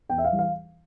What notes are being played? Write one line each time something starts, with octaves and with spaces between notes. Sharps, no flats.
E2 G5
E5
F5
E3 G3
F5